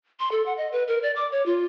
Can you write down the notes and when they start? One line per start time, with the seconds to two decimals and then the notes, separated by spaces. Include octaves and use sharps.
0.20 C6
0.32 A4
0.46 F#5
0.58 D#5
0.72 B4
0.88 A#4
1.02 D5
1.16 D6
1.32 C#5
1.46 F4